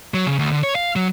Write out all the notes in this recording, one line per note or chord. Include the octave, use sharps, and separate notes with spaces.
F#3
C#3
D2
D3
C#5
F5
F#3